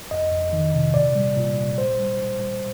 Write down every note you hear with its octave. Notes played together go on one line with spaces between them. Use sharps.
F2 D#5
F2
D#3
C3
A#2 D5
G3
A#2
G3
A#2 C5
G3
A#2
G3